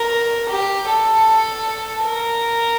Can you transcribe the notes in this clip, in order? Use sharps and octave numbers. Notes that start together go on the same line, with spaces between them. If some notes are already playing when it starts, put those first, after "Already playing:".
Already playing: A#4
G4
A4
A#4